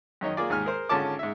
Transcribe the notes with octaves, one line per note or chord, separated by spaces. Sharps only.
F#2 D#3 C#5 D#5
A#3 F4 G#4 D5
D#2 G#2 G#5 F6
G#4 A#4 C5
G#1 D3 C#4 F4 A5 D6
G#2 E5